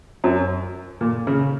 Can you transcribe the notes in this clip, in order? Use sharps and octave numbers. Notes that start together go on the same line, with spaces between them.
F#2
A#2
C#3